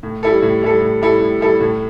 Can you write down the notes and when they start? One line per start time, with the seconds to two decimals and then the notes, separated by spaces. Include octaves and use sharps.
0.03 A2
0.23 G3 E4 A4
0.42 A2
0.62 G3 E4 A4
0.81 A2
1.01 G3 E4 A4
1.21 A2
1.41 G3 E4 A4
1.60 A2